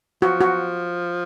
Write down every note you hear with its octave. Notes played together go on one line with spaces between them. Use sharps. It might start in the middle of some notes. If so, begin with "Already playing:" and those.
F3 F#4
F#4